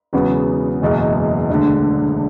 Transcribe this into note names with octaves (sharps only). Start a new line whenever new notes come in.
E1 E2 C#3 F#3 B3
F#1 E2 B2 G#3
E1 D2 D3